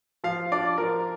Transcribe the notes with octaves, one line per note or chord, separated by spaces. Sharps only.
F3 F5
D4 F4 D5
F3 A#4